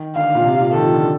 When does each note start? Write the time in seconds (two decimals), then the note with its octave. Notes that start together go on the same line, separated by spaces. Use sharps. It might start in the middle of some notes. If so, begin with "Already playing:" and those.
Already playing: D#3
0.15 D3 F5
0.35 A#2
0.45 C3
0.60 A#2
0.74 D#3 A4
0.84 F3
0.93 D3